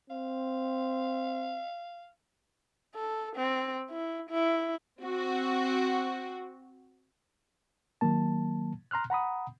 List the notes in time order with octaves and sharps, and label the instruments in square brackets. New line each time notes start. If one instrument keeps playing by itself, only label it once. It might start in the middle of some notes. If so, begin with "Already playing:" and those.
[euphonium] C4 [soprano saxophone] F5
[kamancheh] A4
C4
E4
E4
[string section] C4 F#4
[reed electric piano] D#3 F#3 A#3 A5
A#5 C6 F6 F#6
F#5 A#5 B5 D#6